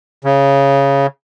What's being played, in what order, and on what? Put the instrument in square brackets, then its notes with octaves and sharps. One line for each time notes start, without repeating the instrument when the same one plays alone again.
[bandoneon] C#3